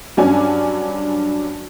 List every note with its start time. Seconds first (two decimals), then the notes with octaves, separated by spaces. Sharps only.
0.17 G2 F#3 C#4 D4 G#5